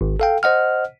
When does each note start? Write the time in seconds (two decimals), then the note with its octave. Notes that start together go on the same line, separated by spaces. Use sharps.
0.01 G#1
0.20 A4 F5 G5
0.43 C5 D#5 F#5 F6